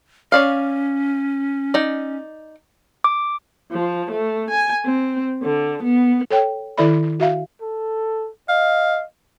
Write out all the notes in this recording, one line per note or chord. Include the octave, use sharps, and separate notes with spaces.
C#4 C#5 D5 F5
D#4 D5
D6
F3
A3
G#5
C4
D3
B3
A4 C#5 G5
D#3 E4 A4 D5 E5 B5
F#4 E5 F5
A4
D#5 F5